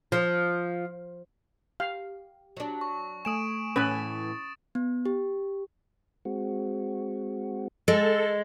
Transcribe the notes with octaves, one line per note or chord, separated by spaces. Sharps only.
F3
G4 F5
F#3 D4
C#6
A3 G#5 D#6 D7 E7
A2 E3 C#4 B4 D#6 A6
B3
G4
G#3 C4 F#4
G#3 A4